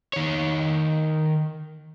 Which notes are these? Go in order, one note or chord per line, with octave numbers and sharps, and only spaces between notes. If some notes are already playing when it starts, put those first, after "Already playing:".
D#3 C#5